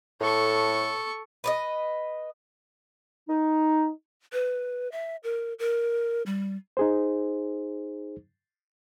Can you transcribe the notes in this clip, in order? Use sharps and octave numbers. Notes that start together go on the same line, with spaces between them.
A2 A4 C#6
B4 D5 D#5
D#4
B4
E5
A#4
A#4
G3
D#4 G#4 C5